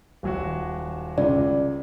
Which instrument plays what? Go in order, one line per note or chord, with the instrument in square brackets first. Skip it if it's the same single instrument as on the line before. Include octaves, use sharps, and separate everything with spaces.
[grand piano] D#1 F#3 F#4
[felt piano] C#2 [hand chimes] D5